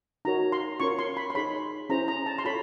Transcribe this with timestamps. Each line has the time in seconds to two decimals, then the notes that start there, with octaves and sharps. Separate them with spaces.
0.25 D#4 F#4 A#4 C#5 A#5
0.52 C6
0.80 C#4 F4 A#4 C#5 C#6
0.99 C6
1.17 B5
1.30 C6
1.35 D#4 G#4 C#5 B5
1.90 C#4 E4 G#4 C5 A#5
2.08 A#5
2.26 A5
2.38 C6
2.45 F4 A4 C#5 B5